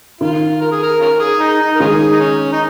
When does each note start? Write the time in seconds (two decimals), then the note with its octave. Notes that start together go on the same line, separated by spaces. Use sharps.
0.21 D#3 F4
0.61 A#4
0.72 G#4
0.82 A#4
1.01 C#4 F4 A#4
1.20 G#4
1.40 D#4
1.60 D#4
1.75 A#4
1.80 D#3 G#3 C#4 F4 G#4
2.12 D#4
2.19 C#4
2.52 D#4